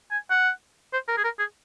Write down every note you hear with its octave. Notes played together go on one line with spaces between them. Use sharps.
G#5
F#5
C5
A#4
G#4
A#4
G#4